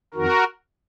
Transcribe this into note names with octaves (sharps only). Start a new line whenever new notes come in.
F2 D#3 F#4 A#4